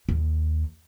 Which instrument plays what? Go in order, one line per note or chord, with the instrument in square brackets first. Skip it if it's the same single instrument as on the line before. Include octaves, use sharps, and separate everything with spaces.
[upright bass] D#2